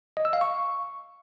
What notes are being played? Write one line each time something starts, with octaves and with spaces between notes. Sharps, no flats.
D#5
E6
F5
C#6